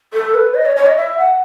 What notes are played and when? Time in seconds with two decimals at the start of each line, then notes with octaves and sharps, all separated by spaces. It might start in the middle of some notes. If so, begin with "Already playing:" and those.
0.14 A4
0.34 B4
0.55 D#5
0.65 C#5
0.76 C#5
0.86 D#5
0.96 E5
1.18 F#5